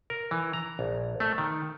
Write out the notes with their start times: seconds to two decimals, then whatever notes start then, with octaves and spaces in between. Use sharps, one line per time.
0.10 A#4
0.31 E3
0.53 A#5
0.79 A#1
1.20 A3
1.38 D#3